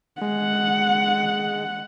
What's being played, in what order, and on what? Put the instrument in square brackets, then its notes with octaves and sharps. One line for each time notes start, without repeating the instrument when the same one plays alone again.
[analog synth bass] G#3 [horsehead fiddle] F#5